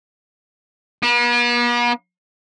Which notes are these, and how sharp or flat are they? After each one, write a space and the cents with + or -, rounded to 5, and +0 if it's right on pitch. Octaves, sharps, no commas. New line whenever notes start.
B3 -45